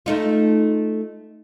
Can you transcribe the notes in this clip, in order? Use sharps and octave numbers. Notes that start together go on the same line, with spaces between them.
A3 D#4 F4